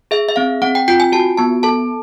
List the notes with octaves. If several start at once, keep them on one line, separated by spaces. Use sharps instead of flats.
G#4 E5
E5
C4 F5
C4 F#5
G5
F4 G5
G#5
F#4 A5
B3 A5
A4 A5